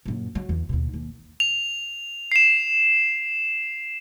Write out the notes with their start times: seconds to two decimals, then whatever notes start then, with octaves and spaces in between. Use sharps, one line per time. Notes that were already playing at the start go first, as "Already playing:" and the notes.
0.05 F#2 A#2
0.35 F#3
0.49 E2
0.69 D#2 B2
0.93 D#2
1.40 F7
2.32 C7 E7